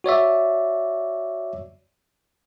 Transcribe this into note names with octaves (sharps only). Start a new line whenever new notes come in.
F#4 C#5 D5 E5